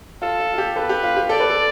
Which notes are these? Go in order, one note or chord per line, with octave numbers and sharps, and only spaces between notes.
F4 A4
F4
F4
G4
A4 B4
G4
F4
G4
A4 D5
B4
A4